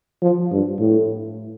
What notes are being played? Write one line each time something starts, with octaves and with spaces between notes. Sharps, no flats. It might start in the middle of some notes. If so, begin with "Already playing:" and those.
F3
G2
A2